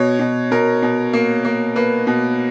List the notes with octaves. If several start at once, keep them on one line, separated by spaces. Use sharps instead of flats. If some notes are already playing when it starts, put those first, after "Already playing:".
Already playing: B2 C#5
B2
B2 A#4
B2
A#3
A#3
A#3 B4
B2